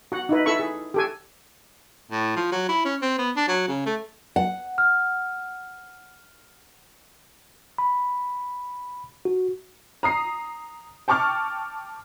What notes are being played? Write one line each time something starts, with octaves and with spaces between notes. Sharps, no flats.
F#4 F#5
D#4 E4 B4
E4 A4 E5 B5 C#6
G#4
G4 A4 G#5
A2
F3
F#3
E4
C#4
C4
B3
D4
F#3
C#3
A3
F#5
F6
B5
F#4
A#5 D#6 C7
G5 A5 C#6 D6 F6